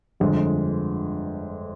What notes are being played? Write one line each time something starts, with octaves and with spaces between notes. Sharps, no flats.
G1 F2 D3 G#3